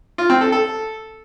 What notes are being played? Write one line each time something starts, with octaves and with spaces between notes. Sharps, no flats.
F4
C4
A4
A4